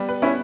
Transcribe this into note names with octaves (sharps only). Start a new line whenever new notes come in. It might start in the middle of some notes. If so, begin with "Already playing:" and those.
Already playing: G3 B3
B4
B3 C#4 E4